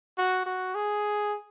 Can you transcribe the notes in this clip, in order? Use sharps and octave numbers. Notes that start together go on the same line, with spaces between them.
F#4
F#4
G#4